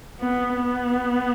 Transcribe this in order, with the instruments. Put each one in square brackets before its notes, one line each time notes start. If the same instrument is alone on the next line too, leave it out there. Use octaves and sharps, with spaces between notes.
[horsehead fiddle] B3
B3